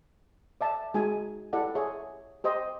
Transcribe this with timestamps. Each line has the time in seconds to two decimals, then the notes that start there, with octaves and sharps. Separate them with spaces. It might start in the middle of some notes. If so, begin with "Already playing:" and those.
0.61 D5 E5 A5
0.94 G#3 D#4 F#4 G#4 G#5
1.53 E4 G4 A4 D5 F#5
1.75 G#4 C#5 E5
2.44 G4 C5 D#5